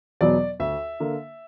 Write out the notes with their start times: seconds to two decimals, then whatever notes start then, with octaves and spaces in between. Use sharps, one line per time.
0.21 E2 B2 F#3 B3 D5
0.60 D2 E5
1.00 D3 A#3